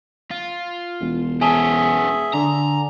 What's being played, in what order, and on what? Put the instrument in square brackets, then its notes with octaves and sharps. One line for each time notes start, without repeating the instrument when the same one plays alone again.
[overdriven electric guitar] F4
[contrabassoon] E1
[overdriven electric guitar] B3 C#4 [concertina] G#4 E5 [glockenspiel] G#5 A5 G7
[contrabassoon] D3 [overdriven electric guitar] A#5